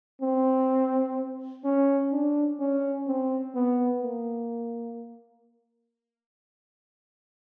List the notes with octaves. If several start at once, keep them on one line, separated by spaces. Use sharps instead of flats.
C4
C#4
D4
C#4
C4
B3
A#3